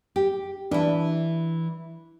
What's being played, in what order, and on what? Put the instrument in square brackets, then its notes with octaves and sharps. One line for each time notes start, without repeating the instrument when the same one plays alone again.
[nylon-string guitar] G4
[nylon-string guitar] E3 E4 [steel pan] D4